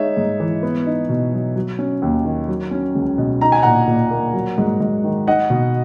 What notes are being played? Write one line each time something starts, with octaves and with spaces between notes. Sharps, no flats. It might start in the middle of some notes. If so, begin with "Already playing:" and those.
Already playing: G#3 D#4 C#5 E5
G#2
E3
B3
D#4
B2
F#3
F#3
C#4
D#2
D#3
F#3
C#4
C#2
B2
D#4 A#5
G#5
A#2 F#5 A#5
A#2
A#3
F#3
G#2
G#2
D#3
D#4 D#5 F#5
B2